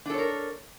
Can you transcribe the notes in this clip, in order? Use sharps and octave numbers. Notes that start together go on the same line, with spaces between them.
D4 A4 A#4 C#5